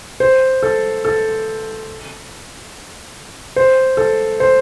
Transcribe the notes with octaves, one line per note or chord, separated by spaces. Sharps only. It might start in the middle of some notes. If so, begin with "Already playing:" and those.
C5
A4
A4
C5
A4
C5